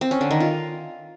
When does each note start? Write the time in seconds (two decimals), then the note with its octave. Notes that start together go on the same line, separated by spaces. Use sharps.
0.01 C4
0.11 C#4
0.21 D3
0.31 D#3
0.40 F4